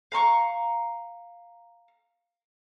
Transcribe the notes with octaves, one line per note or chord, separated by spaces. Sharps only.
F5 A#5 C6 C#6